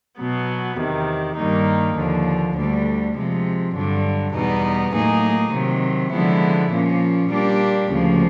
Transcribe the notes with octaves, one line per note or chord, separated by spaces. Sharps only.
B2 F#3 B3
E2 C3 D#3
G2 D#3 G3 A#3 D#4
D#2 D3 F3
D2 D3 G3
C3 F3 G#3
G2 D3 F#3
E2 B2 G3 B3 D#4
A2 F#3 A#3 D#4 G#4
C3 D#3 F#3
D3 F3 G#3 B3 E4
A#2 F3 A#3 C#4
A#2 G3 A#3 D4 G4
D2 C#3 F3 A#3